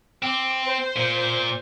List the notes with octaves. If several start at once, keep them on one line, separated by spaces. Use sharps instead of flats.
C4 D6
C5
A#2